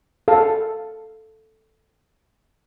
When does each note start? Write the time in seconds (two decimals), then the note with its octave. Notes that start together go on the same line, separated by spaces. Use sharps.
0.28 A4 F5